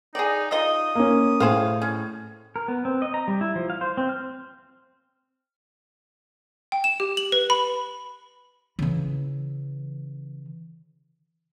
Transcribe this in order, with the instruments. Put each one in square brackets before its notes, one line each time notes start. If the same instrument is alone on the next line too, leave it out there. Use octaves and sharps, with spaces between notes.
[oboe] D#4 [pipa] G#4 D5
[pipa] D#4 F4 D#5 [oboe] D#6
[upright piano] A#3 C#4
[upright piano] A2 [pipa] G#4 C5 F5
[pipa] C#4
[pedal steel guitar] A#4
B3
C4
D#5
A#5
G3
E4
F3
F5
C5
C4
F6
[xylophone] G5
E7
G4
F#7
B4
B5
[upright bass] C#3 E3